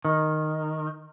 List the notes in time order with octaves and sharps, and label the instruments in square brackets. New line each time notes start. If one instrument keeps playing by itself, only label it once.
[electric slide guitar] D#3